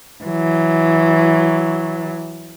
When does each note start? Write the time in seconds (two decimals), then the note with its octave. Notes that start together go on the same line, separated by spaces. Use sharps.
0.24 E3 F#3